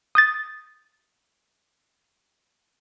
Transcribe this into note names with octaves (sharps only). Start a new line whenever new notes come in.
D#6 G6 A6